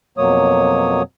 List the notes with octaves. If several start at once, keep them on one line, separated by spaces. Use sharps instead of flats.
F2 B2 F#3 A#3 C#5 D#6